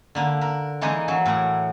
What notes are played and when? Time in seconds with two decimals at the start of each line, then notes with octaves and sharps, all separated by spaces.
0.15 D3 A#3 B4
0.41 A#4 B5
0.81 E3 G#3 A#3 D#4 G#4 B4
1.08 E3 F#3
1.26 A2 A#4 B4 F#5